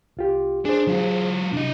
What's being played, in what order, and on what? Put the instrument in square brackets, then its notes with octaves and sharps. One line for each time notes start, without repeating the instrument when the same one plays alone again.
[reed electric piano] C2 F4 G4
[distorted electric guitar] D4 [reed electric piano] G#4 C5
[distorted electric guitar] F#3 F4
[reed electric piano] C3 [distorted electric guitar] D4 D#5